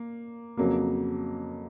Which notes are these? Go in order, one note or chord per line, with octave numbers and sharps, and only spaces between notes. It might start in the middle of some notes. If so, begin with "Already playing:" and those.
Already playing: A#3
F2 C#3 F#3 A#3